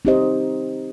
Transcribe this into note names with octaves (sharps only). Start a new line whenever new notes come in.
C4 D#4 G4 C5 D#5